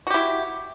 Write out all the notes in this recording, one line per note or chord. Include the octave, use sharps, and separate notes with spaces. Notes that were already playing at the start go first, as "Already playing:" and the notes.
E4 F#4 G4